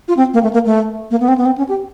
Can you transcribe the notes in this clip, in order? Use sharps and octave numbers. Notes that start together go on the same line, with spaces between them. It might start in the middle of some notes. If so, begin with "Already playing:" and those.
F4
C4
A#3
A3
A#3
A3
A#3
B3
C4
B3
C4
C#4
G4